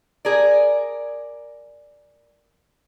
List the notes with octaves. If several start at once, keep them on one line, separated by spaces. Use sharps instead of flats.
G#4 A#4 D5